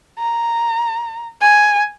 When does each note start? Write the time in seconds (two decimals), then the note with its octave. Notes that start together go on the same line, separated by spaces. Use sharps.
0.19 A#5
1.41 G#5